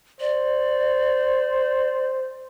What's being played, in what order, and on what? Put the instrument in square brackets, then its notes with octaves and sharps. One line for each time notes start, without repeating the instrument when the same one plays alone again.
[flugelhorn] C5 [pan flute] D5